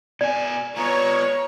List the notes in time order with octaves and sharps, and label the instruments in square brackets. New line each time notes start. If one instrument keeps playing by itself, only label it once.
[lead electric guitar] B2 G#5 [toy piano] D5
[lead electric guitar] B3 F4 [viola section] C#5 [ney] A#5